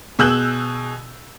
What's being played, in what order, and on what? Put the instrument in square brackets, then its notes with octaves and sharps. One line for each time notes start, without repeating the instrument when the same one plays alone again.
[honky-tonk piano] B2 G#4 E6 F#6 G6 F#7